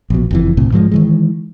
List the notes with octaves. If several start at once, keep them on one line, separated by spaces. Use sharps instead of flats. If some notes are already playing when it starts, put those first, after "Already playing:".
A#1 B2
F#1 F2 E3
B1 A2 C3
G#2 F3 F#3 G#3
D#3 E3 G#3